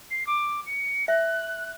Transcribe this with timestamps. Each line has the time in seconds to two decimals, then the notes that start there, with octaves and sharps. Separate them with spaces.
0.11 C7
0.27 D6
0.66 C#7
1.08 E5 F#6